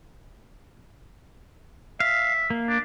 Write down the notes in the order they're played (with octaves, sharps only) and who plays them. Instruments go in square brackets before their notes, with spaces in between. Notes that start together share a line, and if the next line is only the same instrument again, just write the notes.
[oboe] E5 [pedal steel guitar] F5
[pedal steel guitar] A#3
[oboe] D4